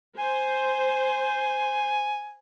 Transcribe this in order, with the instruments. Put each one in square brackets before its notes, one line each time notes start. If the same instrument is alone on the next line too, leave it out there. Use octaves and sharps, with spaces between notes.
[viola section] C5 [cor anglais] G#5